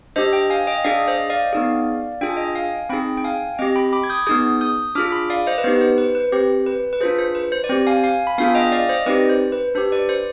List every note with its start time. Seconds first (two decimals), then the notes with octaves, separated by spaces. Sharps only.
0.16 D4 G4 C5 D#5
0.33 D#5 G5
0.50 F5 G#5
0.67 D#5 G5
0.84 D4 G#4 D5 F5
1.07 C5 D#5
1.30 D5 F5
1.53 B3 D#4 G#4
2.21 D4 F4 G#4 G5
2.29 G#5
2.36 D#5 G5
2.55 F5 G#5
2.89 C4 D#4 G#4 G5 B5
3.17 G5
3.24 F5 G#5
3.59 C4 G4 D#5 G5
3.76 G5 B5
3.93 B5 D6
4.04 G#6
4.09 D#6 G6
4.26 B3 D#4 G#4 D#6 G6
4.61 D#6 G6
4.95 D4 F4 G#4 D6 F6
5.12 B5 D6
5.30 D5 F5
5.47 C5 D#5
5.58 B4
5.64 B3 D#4 G4 C5
5.76 B4
5.81 C5
5.98 B4
6.15 B4
6.32 C4 G4 C5
6.66 B4
6.93 B4
7.01 D4 F4 G#4 C5
7.19 C5
7.35 B4
7.52 C5
7.64 D5
7.69 C4 G4 C5
7.87 F5 G#5
8.04 F5 G#5
8.27 B5
8.38 B3 D4 F4 G#4 F5 G#5
8.55 D#5 G5
8.66 D#5
8.72 D5 F5
8.89 C5 D#5
9.06 C4 D#4 G4 B4 D5
9.29 C5
9.52 B4
9.75 D4 G4 C5
9.92 B4 D5
10.09 C5